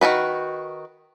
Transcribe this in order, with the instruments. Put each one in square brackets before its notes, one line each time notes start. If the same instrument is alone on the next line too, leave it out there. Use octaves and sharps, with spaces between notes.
[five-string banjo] D#3 F3 F#4 B4